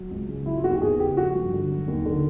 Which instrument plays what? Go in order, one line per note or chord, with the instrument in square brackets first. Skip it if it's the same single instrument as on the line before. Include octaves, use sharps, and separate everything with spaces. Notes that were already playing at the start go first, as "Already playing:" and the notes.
Already playing: [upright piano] F#3
C#2
C#3
F#3 E4
F4
D#2 F#4
G4
E2 G#4
C#3 G4
F3 F#4
G2
D3
F#3
D#2
D3